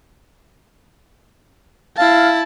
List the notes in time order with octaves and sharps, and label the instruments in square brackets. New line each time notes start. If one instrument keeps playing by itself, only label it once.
[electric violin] E4 A5 [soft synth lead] F5